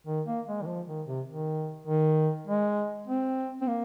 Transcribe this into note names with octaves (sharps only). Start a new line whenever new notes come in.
D#3
A#3
G#3
D#3
F3
D#3
C3
D#3
D#3
G#3
C4
C4
A#3